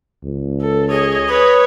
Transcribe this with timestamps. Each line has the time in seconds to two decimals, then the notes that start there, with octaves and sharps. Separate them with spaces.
0.24 C#2
0.62 A4
0.91 G#4 C#5 D#5
1.28 B4 C#5 D#6